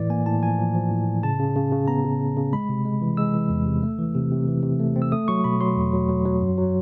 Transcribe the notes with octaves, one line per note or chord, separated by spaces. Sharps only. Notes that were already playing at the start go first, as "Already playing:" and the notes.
Already playing: A2 E3 D5
A#3 G#5
A2 A5
F3 G#5
F3
F3
A2
A2
C#3 A5
C#3
C#3
C#3
B3 A#5
C#3
C#3
C#3
G#3 B5
C3
G#3
E3
G#3 E6
E3
E2
C3
A3
E3
C3
C3
E3
C3
A3
C4
E6
A3 D#6
F#3 C#6
B2 B5
F#3 C6
E2
F#3
F#3
F#3
F#2
F#3